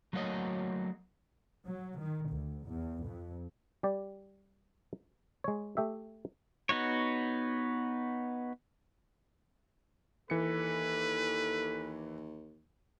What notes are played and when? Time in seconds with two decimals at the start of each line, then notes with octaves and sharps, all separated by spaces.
0.13 F#3 A3 A#3 F#4 C#5 D#5
1.66 F#3
1.99 D#3
2.30 D2
2.66 E2
3.04 F2
3.83 G3 G4 D5
5.44 G#3 C#5
5.77 A3 G4 E5
6.69 B3 D#4 F#4 C#5
10.30 D#2 E3 A4 B4 C#7